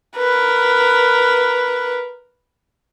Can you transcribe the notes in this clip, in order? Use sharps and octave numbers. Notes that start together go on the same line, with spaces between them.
A#4 B4